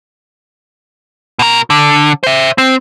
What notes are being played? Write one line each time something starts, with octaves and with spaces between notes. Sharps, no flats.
B2 A#4
D3
C5 E5
C4